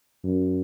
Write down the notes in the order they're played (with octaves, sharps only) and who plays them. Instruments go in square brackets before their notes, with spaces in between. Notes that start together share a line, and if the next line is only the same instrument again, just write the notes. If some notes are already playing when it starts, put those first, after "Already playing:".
[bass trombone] F#2